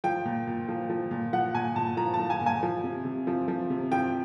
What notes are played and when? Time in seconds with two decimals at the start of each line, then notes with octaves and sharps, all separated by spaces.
0.04 F3 G5
0.25 A#2
0.47 A#2
0.68 F3
0.90 F3
1.11 A#2
1.33 F3 F#5
1.55 A#2 G#5
1.76 A#2 A5
1.97 F3 A#5
2.14 A5
2.19 F3
2.30 G#5
2.41 A#2
2.46 G#5
2.63 F3
2.84 C3
3.05 C3
3.27 F3
3.48 F3
3.70 C3
3.92 F3 G5